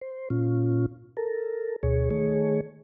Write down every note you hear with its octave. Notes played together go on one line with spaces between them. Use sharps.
C5
A#2 C#4 F4
A4 A#4
D2 B2 G#4 C#5
D#3 A3 G#4 C#5